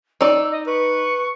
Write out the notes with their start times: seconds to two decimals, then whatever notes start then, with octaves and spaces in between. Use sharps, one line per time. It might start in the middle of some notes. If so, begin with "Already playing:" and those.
0.21 D#4 D5 E6
0.51 D#5
0.67 B4 C#6